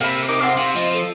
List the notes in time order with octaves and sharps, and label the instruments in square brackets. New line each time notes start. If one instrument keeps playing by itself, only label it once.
[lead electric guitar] C3 [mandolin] A#3 E5 B5
[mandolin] D#4 D6 [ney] A#4
[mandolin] C4 F4 C6 [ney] F#5
[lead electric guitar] C3 [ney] F5
[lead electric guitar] F3 [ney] D#5
[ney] A4